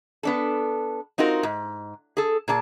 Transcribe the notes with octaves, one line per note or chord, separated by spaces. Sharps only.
B3 D4 A4
C4 D#4 F4 F#4 A#4
G#2
G#4 A4
A#2 G#4 D5 A5